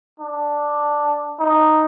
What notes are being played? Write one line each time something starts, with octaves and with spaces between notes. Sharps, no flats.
D4
D#4